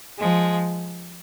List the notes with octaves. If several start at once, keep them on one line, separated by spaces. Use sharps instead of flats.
F3 G#3